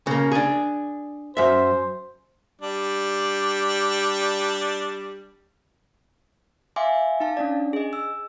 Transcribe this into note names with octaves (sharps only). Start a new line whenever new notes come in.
C#3 A#3
D4 G#4
F#2 C5 E5
G3 D4
E5 F5 G#5 C6 D6
D#4 F5 A5
C#4 D4 D5
G#4 D#5
E6